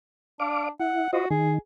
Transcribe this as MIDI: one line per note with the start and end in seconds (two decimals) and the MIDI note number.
0.40 0.69 62
0.40 0.69 74
0.40 0.69 77
0.40 0.69 86
0.80 1.08 64
0.80 1.08 78
1.13 1.26 65
1.13 1.26 66
1.13 1.26 72
1.13 1.26 75
1.31 1.58 51
1.31 1.54 68